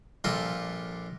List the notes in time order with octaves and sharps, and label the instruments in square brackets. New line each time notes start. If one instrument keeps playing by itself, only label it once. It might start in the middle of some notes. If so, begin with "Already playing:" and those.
[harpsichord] A#1 G3 F4 A4 A#4 C6